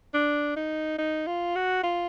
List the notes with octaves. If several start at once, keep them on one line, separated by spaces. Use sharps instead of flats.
D4
D#4
D#4
F4
F#4
F4